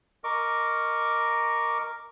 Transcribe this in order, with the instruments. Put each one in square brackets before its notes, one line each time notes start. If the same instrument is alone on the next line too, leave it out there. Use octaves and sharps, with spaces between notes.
[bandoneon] A#4 D#5 C#6 D6